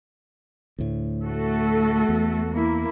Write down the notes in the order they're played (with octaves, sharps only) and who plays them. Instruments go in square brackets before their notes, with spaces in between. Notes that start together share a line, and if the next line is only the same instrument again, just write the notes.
[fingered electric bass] D2 A2
[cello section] A3 F#4 A4
[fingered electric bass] E2
[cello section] A#3 E4